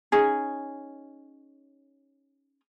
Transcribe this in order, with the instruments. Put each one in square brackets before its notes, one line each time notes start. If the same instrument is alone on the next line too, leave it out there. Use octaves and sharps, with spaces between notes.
[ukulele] C#4 D#4 G#4